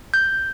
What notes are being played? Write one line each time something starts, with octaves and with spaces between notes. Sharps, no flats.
G6